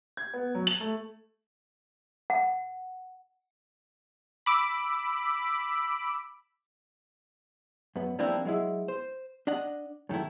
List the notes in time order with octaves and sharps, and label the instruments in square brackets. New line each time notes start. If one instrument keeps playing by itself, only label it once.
[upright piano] G#6
B3
F#3
F#7
A3
[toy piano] F#5
[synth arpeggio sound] B5 D6 E6 D7
[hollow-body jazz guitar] F#2 B3
F3 G3 A#3 C4 D4 E4
F#3 G#3 E4
C5
D4 D#5 F#5
F#2 D#3 A3 E4